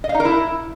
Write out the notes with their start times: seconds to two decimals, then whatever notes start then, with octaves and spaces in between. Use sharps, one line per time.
0.04 D#5
0.09 F5
0.14 D#4
0.20 A#4
0.25 E4